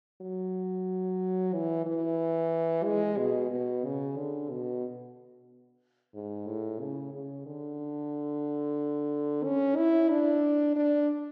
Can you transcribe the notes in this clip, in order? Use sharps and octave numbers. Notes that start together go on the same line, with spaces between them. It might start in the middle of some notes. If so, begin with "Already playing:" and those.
F#3
E3
E3
G#3
B2
B2
C#3
D3
B2
G#2
A2
C#3
C#3
D3
C#4
E4
D4
D4